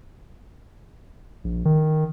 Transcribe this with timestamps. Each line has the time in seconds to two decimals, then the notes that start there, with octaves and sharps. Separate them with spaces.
1.44 A#1
1.65 D#3